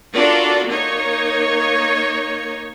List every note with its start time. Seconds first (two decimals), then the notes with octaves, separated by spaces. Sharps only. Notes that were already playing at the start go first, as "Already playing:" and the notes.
0.15 D4 F4 F#4 A4 A#4 D5
0.68 A#3 D#4 C#5